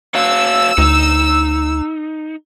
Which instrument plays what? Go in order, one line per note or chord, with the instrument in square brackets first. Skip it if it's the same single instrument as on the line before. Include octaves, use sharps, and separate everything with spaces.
[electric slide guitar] F#4 C#5 F5 [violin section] E6
[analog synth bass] D2 [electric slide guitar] D#4